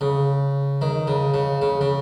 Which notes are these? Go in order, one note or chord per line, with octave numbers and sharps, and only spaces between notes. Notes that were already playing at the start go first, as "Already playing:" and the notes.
C#3
D#3
C#3
C#3
C#3
C#3